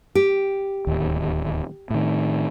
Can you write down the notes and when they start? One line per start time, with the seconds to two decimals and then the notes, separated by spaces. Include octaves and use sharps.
0.15 G4
0.87 D1 D#2
1.90 A2 D#3